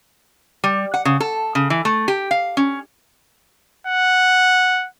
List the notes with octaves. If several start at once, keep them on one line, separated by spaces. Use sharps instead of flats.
G3
F#5
C#3
A4
C#3
E3
A3
G4
F5
C#4
F#5